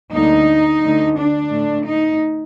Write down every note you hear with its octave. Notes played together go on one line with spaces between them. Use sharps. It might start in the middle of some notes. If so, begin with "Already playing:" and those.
D2 D3 G3 A#3 D#4
D2 D3 A3
D4
A2 A3
D#4